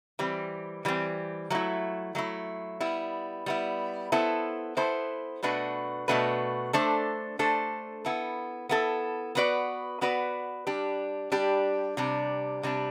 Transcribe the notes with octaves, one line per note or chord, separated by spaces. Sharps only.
E3 G3 C4
E3 G3 C4
F#3 A3 E4
F#3 A3 E4
G3 B3 E4
G3 B3 E4
B3 E4 A4 C5
B3 E4 A4 C5
B2 A3 D4 F#4 B4
B2 A3 D4 F#4 B4
A3 D4 A4 C5
A3 D4 A4 C5
B3 E4 A4
B3 E4 A4
B3 F#4 B4 D5
B3 F#4 B4 D5
G3 D4 G4
G3 D4 G4
C3 G3 D4
C3 G3 D4